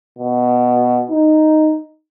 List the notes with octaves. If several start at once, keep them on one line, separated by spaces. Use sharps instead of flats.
B2
D#4